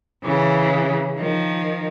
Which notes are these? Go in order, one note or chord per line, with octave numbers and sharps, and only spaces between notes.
C#3 E3
D#3 F3